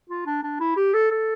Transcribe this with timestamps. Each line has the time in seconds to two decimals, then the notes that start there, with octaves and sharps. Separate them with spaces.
0.10 F4
0.26 D4
0.43 D4
0.60 E4
0.77 G4
0.94 A4
1.11 A4